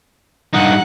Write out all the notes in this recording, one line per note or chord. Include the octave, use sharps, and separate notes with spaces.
G2 D#4 F#5